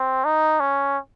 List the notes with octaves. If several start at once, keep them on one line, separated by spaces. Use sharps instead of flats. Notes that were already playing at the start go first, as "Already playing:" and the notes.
Already playing: C4
D#4
C#4